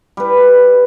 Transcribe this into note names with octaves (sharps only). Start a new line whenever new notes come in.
G3 B4